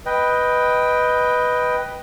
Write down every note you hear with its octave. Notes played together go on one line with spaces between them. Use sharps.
B4 D#5 G5